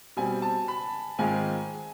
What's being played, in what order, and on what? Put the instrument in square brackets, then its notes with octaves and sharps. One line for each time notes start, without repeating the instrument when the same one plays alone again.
[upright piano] B2 G3 C4 [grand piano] G#5
[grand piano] A5
B5
[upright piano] G#2 D#3 G#3 C4 F4 [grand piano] G#5